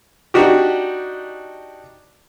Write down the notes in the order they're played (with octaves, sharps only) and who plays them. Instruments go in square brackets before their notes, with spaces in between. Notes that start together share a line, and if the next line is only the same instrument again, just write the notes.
[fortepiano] D4 D#4 F#4 G4